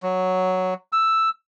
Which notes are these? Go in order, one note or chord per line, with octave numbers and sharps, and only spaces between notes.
F#3
E6